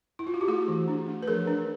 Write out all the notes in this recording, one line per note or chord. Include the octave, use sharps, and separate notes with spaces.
E4
F4
F#4
G4
A3 F#4 G#4
E3
D4
A3
B4
F3 G#4 A#4
D4